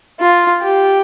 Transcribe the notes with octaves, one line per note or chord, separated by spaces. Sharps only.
F4
G4